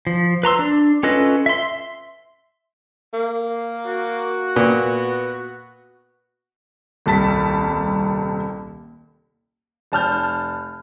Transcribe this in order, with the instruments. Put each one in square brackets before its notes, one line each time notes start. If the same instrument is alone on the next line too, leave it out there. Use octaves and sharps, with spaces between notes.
[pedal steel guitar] F3
B4 A#5 C6 E6
D4
C#4 F4 A4 B4 D#5
E5 C6
[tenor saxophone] A#3
[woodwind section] F#4
[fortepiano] A#2 [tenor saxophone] B3
[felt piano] D#1 C2 A5 B6
[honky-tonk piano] F1 A5 F6 G6